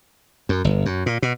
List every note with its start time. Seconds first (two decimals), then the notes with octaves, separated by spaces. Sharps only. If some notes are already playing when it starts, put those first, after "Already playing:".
0.49 F#2
0.64 G1
0.86 F#2
1.06 A#2
1.22 B2